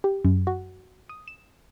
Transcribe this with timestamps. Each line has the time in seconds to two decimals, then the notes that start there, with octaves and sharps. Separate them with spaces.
0.04 G4
0.25 F#2
0.47 F#4
1.09 D#6
1.28 E7